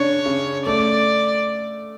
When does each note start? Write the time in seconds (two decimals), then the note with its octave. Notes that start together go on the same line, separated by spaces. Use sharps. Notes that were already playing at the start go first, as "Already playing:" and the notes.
Already playing: C#3 D4 C#5
0.26 C#3
0.66 A3 D5